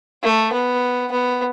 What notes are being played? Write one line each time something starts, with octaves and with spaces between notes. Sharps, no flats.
A3
B3
B3